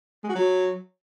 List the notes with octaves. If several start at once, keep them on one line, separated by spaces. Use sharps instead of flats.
G#3
F#4
F#3